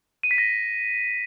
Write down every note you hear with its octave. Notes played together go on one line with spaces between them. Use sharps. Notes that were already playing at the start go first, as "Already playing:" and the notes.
D#7
B6
A#6